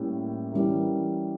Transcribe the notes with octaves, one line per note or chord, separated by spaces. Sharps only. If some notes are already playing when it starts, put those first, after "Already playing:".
Already playing: A2 G3 A#3 C#4
E3 G3 C#4 E4 A#4